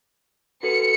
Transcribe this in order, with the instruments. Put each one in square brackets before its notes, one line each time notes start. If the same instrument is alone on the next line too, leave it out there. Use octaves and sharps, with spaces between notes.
[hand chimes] F#4 A4 B4 [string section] C#7